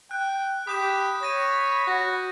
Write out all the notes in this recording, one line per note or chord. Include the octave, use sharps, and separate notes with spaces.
G5 F#6
G4 B5 D#6 G6 E7
C#5 A#6 D#7
F#4